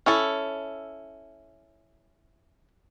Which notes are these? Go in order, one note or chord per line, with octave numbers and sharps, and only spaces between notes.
C#4 E4 A4